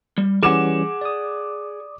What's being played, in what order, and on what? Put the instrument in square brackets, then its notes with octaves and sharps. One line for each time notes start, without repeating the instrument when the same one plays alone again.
[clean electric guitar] G3
[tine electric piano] E3 G3 C#4 [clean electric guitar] G#4 F#5 [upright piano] D6 E7
[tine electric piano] D5 D#6